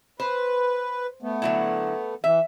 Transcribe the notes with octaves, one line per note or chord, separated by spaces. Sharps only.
B4 C5
A3 B3
D3 F#3 E4
E3 E5